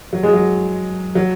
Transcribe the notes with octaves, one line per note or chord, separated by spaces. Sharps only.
F#3
G#3
F#3
F#3